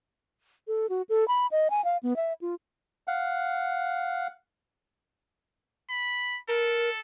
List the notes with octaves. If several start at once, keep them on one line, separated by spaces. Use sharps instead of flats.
A4
F#4
A4
B5
D#5
G#5
F5
B3
E5
F4
F5 F#5
B5
A4 A#4